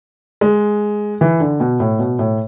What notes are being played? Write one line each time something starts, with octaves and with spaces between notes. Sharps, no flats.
G#3
E3
D3
B2
A2
B2
A2